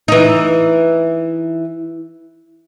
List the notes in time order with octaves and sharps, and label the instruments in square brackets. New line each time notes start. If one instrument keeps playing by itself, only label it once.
[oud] E3 D#4